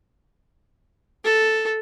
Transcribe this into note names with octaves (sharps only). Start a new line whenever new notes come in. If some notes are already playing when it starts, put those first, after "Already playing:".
A4